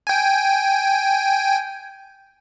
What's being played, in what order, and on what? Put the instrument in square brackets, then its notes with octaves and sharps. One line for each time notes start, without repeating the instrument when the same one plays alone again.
[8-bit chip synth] G5 G#5